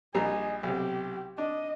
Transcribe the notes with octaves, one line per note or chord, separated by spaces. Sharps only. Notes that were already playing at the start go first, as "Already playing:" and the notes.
A#1 G3 G#4 D#5 A#5
B1 C3 G4
D4 D#5